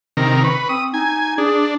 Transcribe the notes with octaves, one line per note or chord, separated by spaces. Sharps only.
C3 D#3 A#4
B4 C#6
C4 D#6
D#4 G#5
D4 G#4